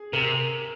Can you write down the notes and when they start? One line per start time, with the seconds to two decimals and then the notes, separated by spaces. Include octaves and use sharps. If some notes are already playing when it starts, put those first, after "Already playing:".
Already playing: G#4
0.13 C3 A#4